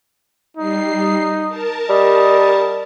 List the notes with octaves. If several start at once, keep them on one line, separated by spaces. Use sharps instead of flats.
G3 D#4 C7
A#4 A5
G3 D#5